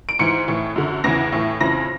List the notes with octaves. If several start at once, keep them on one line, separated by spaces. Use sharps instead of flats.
D7
G#2 E3 C#7
A2 E3
F#2 D3
E2 C#3 E3 A#6
A2 E3
F2 C#3 E3 A#6